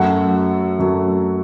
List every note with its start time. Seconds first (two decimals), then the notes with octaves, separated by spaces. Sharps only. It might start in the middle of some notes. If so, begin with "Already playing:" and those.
Already playing: F#2 F#3 A3 F#5
0.79 F#2 F#3 A3